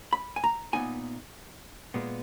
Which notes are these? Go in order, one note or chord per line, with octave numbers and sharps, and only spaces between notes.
B5
G#5
A#5
A#2 F3 B3 D#4 G#5
A#2 G#3 B3